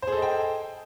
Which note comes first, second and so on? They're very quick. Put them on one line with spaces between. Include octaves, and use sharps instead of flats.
C5 G#4 A4 D#5 G5